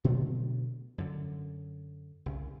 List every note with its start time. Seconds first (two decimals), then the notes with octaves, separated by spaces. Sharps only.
0.04 B2 D3 F#3 A3
0.98 F#2 D3
2.26 C2 C#3